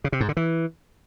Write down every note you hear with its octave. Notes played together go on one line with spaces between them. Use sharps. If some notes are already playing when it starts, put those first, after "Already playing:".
C#3
C3
G#2
D3
E3